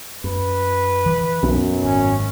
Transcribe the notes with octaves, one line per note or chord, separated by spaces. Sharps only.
F#2 B4
E3
B1 F#2 B3 C#4
G#1 C#4